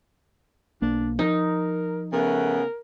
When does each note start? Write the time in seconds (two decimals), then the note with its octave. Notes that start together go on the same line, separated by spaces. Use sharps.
0.82 B1 A#3 D4
1.19 F3 D#4 A#4
2.13 C#3 A3 B3 A#4